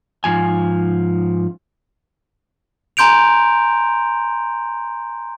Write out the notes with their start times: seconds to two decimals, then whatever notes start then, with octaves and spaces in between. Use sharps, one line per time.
0.24 G#2 F3 G#5
2.97 G#5 A#5 C6 G6 D7 F7